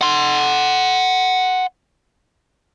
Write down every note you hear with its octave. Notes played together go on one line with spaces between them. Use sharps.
F#5 C6